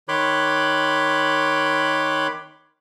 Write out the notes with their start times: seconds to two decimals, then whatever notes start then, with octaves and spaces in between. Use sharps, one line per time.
0.08 D#3 C#5 B5 C6 D6 F#6